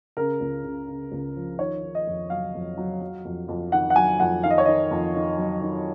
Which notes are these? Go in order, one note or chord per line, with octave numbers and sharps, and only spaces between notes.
C#3 A#4
C#2
C#3
C#3
C#2
F3
D#3 C#5
D#3
D#5
F2
F#3 F5
F2
F#3
F#3
F2
F2
D#3 F#5
F#5
F#3 G#5
F2 F#5
D#3 F5
D#5
C#5
D#3 D#5
F2
D#3
F#3
D#3